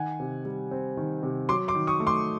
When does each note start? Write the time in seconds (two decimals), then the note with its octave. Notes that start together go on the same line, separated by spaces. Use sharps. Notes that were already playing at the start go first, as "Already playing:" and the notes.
Already playing: D#3 F#5 G#5
0.20 C3
0.45 G3
0.71 C4
0.97 D#3
1.23 C3
1.49 F#3 C6 D6
1.68 C6 D6
1.75 D#3
1.87 C#6 D#6
2.00 A3
2.07 C6 D6